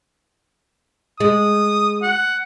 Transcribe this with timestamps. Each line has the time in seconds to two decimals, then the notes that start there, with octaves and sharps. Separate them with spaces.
1.20 G#3 D#6
2.02 F#5